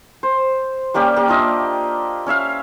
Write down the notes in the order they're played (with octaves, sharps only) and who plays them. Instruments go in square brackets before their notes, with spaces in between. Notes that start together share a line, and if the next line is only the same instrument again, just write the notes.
[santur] C5
G3 A#3 C#4 G4
A#3 G4
D4 F4 D#5 E5
C#4 C#5 E5 F5